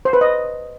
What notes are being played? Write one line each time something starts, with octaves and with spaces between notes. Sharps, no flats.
C5
B4
D#5